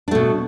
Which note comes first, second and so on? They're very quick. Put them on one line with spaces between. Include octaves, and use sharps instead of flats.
D4 A3 B2